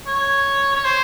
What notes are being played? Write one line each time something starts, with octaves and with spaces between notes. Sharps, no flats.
C#5
C#5
C5